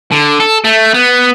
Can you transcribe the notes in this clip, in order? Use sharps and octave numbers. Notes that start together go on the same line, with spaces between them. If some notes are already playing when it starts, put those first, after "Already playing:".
D3
A4
A3
B3